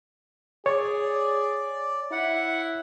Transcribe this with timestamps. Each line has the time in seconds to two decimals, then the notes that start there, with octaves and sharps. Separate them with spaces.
0.66 G#4 C#5 D5
2.12 E4 F#5